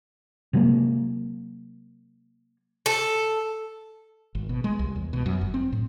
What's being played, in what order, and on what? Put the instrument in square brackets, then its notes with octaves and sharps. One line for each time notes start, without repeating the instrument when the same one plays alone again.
[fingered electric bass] C3 F#3 G#3 A#3
[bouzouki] A4
[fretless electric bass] G#1
B2
G#3
C2
E2
B2
F#2
G1
C4
A2